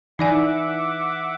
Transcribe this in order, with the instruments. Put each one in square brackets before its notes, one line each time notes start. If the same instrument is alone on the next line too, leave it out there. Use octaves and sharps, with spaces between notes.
[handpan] E3 [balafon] D#4 D5 G#5 [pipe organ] E5 F#5 D6